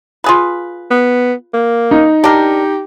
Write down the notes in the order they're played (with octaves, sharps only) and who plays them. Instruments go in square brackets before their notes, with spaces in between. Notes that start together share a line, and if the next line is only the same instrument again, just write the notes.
[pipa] F4 G#4 B4
[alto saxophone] B3
A#3
[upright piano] D#4
[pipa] D4 A#4 [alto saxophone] G4